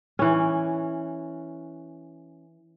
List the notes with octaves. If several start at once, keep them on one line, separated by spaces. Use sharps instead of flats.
E3 C#4